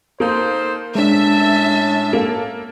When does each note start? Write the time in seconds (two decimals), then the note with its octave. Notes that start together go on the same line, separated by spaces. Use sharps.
0.20 A#3 D#4 A4 C5
0.95 A2 G#3 C#4 D4 E5 A5
2.13 A#3 A4